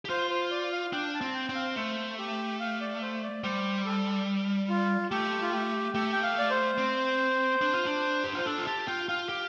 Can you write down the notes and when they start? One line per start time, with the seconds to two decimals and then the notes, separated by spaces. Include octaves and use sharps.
0.05 G4
0.10 F4 C5
0.30 C5
0.51 D5
0.72 F5
0.93 D4 G5
1.14 A5
1.21 C4
1.34 G5
1.49 C4
1.55 F5
1.76 A3 C5
2.18 G4
2.60 F5
2.81 D5
3.02 C5
3.23 D5
3.43 G3 C5
3.85 A4
4.69 F4
5.11 A3 G4
5.42 F4
5.53 G4
5.94 A3 G4
6.13 G5
6.23 F5
6.39 D5
6.50 C5
6.78 C4
7.61 D4
7.73 F4
7.86 D4
8.24 G4
8.35 F4 C5
8.45 D4 A4
8.58 F4
8.67 G4 A5
8.87 F4 G5
9.09 F4 F5
9.29 G4